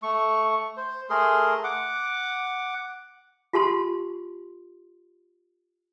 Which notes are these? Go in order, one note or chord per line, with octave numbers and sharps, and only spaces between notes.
A3 C#6
C5
A3 G#4 A#4 C6
F#5 D6
F4 G4 A5 C6